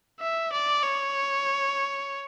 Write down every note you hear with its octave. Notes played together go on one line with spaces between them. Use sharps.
E5
D5
C#5